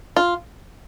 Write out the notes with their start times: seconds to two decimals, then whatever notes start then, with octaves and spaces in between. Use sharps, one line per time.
0.16 F4